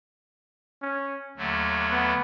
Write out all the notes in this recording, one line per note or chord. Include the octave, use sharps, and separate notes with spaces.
C#4
D#2 D3 F#3 A3
B3